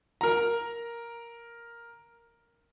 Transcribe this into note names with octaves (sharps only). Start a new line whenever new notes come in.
A#4 A#5